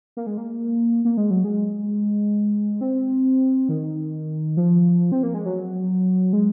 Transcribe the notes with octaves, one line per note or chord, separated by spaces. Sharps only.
A#3
G#3
A#3
A#3
G#3
F#3
G#3
C4
D#3
F3
C4
A#3
G#3
F#3
G#3